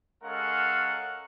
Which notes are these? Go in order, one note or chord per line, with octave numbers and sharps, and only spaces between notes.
G#3 C#4 A4 A#4 F5 F#5